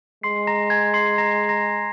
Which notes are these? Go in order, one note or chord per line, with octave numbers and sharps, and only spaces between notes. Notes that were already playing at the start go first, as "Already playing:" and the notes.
G#3 C6 C7
A#5 A#6
G#5 G#6
C6 C7
A#5 A#6
A#5 A#6